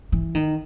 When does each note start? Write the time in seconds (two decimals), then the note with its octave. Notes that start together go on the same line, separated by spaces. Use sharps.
0.12 E3
0.35 D#3